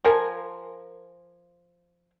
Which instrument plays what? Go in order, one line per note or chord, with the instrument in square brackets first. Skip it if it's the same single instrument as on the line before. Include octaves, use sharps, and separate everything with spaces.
[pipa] F3 A#4 G#5